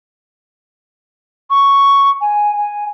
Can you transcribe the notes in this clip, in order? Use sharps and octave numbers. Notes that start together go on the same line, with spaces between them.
C#6
G#5
G#5